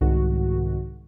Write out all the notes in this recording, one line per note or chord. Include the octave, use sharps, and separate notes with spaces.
C2 G#2 D#3 F#4